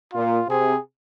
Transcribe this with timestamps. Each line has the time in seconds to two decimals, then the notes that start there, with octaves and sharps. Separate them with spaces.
0.13 A#2 F4
0.49 C3 G#4